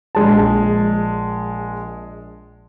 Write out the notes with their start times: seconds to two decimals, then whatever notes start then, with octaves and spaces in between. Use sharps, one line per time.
0.15 A#1 G#3 A5